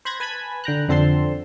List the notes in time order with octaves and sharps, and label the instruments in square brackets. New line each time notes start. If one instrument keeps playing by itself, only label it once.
[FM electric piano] C5 B5 F#6 G#6 A#6
B4 G#5 A5 B5 G#6 B6
D3 G5 A#5 F#6
F2 D3 C4 A4 A5 C6